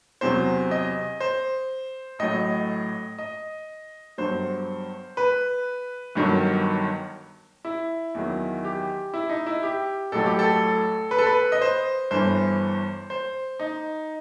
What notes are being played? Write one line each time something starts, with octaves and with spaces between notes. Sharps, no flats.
E2 C3 F#3 C5
D#5
C5
A1 A2 F#3 D#5
D#5
G1 G2 F#3 C5
B4
G1 G2 D#3 F#3
E4
E2 D#3 F#3
G4
E4
D#4
E4
G4
A1 A2 F#3 A4
G4
A4
B4
A4
B4
D#5
C5
G1 G2 E3 C5
C5
D#4